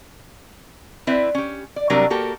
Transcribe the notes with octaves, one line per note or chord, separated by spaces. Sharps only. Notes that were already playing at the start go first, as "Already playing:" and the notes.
C4 E4 B4 D5 E5
C#4 G4
D5
C3 F#3 G3 D4 A#4 D5
A#3 F#4 G4 A4 A#4